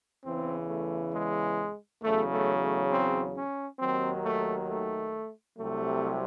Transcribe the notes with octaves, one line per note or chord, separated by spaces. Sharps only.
E2 C#3 E3 C4
A3
G#3
E2 C#3 F#3 A3
A3
A3
C4
C#4
D#2 D#3 F#3 C4
A3
A3
C2 C3 F#3 A3